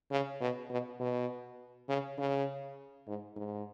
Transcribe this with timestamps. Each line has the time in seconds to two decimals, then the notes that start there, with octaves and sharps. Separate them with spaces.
0.11 C#3
0.41 B2
0.70 B2
1.00 B2
1.89 C#3
2.18 C#3
3.07 G#2
3.36 G#2